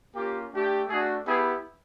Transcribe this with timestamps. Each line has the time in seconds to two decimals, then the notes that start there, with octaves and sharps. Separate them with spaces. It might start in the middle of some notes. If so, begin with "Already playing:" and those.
0.15 A#3 C#4 F4 G4
0.52 A3 D4 G4
0.88 A3 D4 F#4 G#4
1.25 B3 E4 G4 G#4